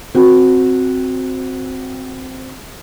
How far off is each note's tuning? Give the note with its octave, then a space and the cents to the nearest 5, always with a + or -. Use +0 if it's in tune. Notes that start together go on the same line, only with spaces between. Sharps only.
C4 +0 F#4 -10